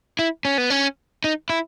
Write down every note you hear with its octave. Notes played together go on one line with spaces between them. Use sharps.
E4
C#4
B3
C#4
D#4
E4